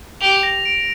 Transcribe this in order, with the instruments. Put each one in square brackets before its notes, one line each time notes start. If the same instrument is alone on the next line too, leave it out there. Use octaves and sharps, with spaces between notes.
[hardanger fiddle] G4 [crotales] F7
[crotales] A#6
D7